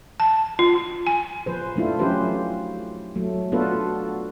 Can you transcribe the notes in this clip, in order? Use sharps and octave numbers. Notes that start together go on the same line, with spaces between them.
A5
F4
G#5
F3 B4 C5
F3 A3 D4 E4 F4
F3 F#3 C#4 G4 B4 C5
F#3 A3
B3 D4 F4 F#4 A4 B4